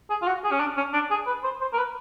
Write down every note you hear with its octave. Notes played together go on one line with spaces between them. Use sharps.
G#4
F4
F#4
G#4
C#4
D4
C#4
D4
G#4
B4
C5
C5
A#4
B4